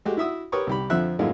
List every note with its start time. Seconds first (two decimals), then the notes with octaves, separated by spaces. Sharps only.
0.05 G#3 A3 F#4 G4
0.17 E4 F#4 E5 D#6 E6
0.52 G4 A#4 B4 C#5 C#6 D#6
0.67 C2 G4 B5
0.90 F2 D3 F3 C4 E5 F#6
1.19 F#2 A2 G#3 A#3 F4